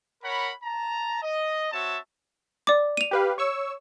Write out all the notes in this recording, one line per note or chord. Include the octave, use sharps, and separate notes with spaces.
A#4 C#5 F#5 B5
A5 A#5
D#5
C4 F#4 C#5 E5 A5
D5 D6
D#7 F7
G4 B4 F5
C#5 C#6 E6